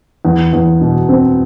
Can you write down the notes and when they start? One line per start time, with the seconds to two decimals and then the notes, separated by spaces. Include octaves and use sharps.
0.25 E2
0.53 E2
0.81 B2
1.09 C4